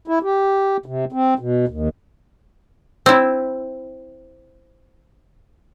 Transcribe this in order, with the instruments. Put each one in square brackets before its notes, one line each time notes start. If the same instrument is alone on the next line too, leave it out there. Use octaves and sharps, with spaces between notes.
[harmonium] E4
G4
C3
C4
B2
D#2
[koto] C4 E4